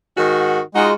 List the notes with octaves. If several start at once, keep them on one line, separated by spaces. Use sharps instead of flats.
G#2 D#3 F#4
G#3 D#4 F4 F#4